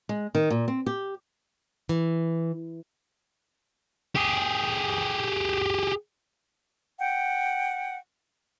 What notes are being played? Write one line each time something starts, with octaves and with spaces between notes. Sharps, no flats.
G#3
D#3
A#2
C4
G4
E3
G4 G#4
F#5 G5